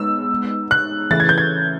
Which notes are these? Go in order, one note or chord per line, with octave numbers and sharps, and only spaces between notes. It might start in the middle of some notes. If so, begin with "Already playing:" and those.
Already playing: G#3 B3 D#4 E6
F#6
C#3 E3 A3 A6
G#6
G6
G#6